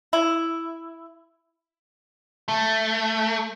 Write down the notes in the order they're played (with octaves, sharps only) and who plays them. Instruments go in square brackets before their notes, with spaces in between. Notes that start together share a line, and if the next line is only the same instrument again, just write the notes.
[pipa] E4
[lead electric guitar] A3